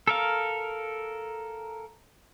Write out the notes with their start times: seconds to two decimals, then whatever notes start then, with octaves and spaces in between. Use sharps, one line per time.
0.08 A4 A#4 F5